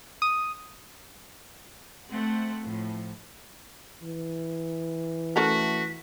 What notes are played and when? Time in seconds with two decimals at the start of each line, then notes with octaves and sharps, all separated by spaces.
0.22 D#6
2.10 A3 C4 F#5
2.62 A2 F3
4.02 E3
5.36 A3 C#4 F#4 A4 A#4 B6